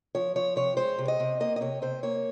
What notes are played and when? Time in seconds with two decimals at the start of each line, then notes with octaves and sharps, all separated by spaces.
0.15 F3 C#5
0.36 F3 C#5
0.56 C3 C#5
0.77 G#3 C5
0.98 C3
1.08 D#5
1.20 C3
1.40 A#3 D#5
1.56 D#5
1.61 C3 C#5
1.82 C3 C5
2.03 A#3 C#5